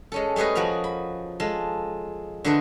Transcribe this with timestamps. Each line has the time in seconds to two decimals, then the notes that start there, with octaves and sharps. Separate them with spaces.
0.12 G#3 C#4 A4
0.36 G3 A3 G#4 B4 D#5
0.55 F3 F#4 A#4 A#5
0.84 B5
1.40 G#3 F4 A4
2.45 D3 A3 D4 A#4 B4 D#5